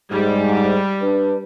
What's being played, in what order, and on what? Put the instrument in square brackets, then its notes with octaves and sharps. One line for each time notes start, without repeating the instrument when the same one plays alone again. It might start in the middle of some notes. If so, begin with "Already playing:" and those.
[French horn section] G#2 [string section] G3
[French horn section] D4 B4